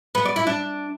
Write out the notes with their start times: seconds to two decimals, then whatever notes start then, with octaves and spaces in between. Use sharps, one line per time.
0.15 B3
0.25 D5
0.36 E4
0.47 D4